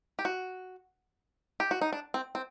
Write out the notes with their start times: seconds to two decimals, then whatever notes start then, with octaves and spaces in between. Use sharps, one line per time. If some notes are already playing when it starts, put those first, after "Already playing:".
0.19 G4
0.25 F#4
1.60 G4
1.71 F#4
1.81 D#4
1.93 D4
2.14 C4
2.35 C4